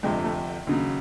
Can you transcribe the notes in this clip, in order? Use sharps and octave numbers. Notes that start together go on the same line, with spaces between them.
G1 F2 C3 G#3
A3
D#2 C#3 F#3